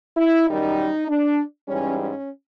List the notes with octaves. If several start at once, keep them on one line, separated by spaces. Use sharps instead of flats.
E4
F#2 D#3 G3 D#4
D4
G#2 E3 G3 C#4
C#4